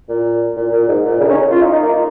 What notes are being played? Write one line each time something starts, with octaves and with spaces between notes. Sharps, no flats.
A#2
A#2
A#2
G#2
A#2
C#3
D#4
C#4
F4
D#4
D#4
A#3